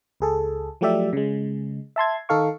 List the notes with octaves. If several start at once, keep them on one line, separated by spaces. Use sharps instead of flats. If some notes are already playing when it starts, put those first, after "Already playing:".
C#2 G#4 A4
F3 F#3 A3 G4 D5 E5
C#3 G#3
E5 A5 C6 G#6
D#3 D#4 A4 F5 C#6